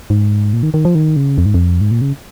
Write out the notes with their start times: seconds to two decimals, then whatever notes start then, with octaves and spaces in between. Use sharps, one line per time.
0.10 G#2
0.53 A#2
0.63 D#3
0.74 D#3
0.85 F3
0.95 D#3
1.16 C#3
1.38 F2
1.46 G#2
1.54 F2
1.81 G#2
1.91 A#2
2.01 C#3